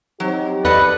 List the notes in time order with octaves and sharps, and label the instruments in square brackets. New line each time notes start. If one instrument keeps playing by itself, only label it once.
[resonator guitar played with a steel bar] F#3 [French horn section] C4 D#4 G4
[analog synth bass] E2 [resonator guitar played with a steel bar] A4 D5 D#5 [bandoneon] B4